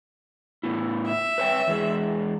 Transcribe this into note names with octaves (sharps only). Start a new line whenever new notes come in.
A2 B3 E4
E5
B4 C#5 G5
E2 G#3